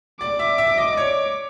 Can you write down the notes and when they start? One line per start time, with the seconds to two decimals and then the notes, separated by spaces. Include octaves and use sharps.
0.21 D5 D6
0.39 E5
0.58 E5
0.77 D#5
0.93 D5
0.97 C#5